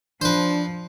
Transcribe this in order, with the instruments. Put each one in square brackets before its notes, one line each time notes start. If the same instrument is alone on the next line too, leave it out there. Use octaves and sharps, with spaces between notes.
[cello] F3 [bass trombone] D4 [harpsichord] B4 C5